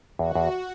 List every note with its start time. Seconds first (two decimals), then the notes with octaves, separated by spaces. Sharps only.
0.19 E2 F#4
0.35 E2